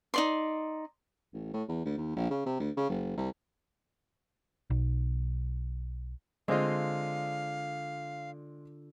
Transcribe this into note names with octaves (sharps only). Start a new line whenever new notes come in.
D#4 D5 C6
A1
A2
E2
D2
D#2
A#1
C#3
C3
D2
C#3
F#1
C2
B1
D3 G#3 C4 F4 D#5 F5